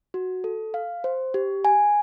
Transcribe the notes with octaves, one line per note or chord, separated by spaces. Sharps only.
F#4
A4
F5
C5
G4
G#5